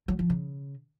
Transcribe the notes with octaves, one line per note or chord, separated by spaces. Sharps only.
F#3
F3
C#3